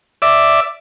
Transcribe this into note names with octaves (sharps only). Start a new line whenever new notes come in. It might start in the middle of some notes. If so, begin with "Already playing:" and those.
D5 E5